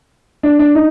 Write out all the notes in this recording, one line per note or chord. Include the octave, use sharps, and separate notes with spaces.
D4
D4
D#4